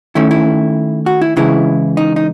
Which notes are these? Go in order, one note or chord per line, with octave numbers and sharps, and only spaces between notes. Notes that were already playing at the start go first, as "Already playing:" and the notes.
D#3 A3 C#4 E4
E4
F#4
E4
C#3 E3 G#3 E4
D#4
D#4